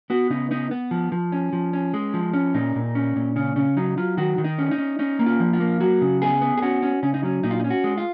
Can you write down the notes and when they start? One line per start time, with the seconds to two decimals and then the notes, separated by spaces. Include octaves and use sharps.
0.10 B3 F#4
0.30 C#3 D#4
0.51 B3 D#4
0.71 B3
0.91 F3
1.12 F3
1.32 C#4
1.53 F3
1.73 C#4
1.94 G#3
2.14 F3
2.34 C#4
2.54 A#2 D#4
2.75 A#2
2.95 C#4
3.16 A#2
3.36 C#3 C#4
3.56 C#3 C#4
3.77 F#3 D#4
3.97 F#3 F4
4.17 D#3 F#4
4.38 D#3
4.44 D#4
4.58 C#4
4.71 D#4
4.78 C#4
4.99 C#4 D#4
5.19 A#3
5.26 F4
5.40 F3
5.53 F4
5.60 A#3
5.80 F#3 F#4
6.01 C#3
6.22 B3 G#4
6.42 B3
6.57 G#4
6.62 C#4 F#4
6.83 C#4
7.03 C#3 C#4
7.14 D#4
7.23 F#3 C#4
7.43 A#2 D#4
7.51 F4
7.60 D#4
7.64 C#4
7.70 F#4
7.84 G#3
7.97 F4